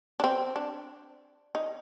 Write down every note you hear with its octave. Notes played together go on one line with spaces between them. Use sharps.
D4
C4
D4
D#4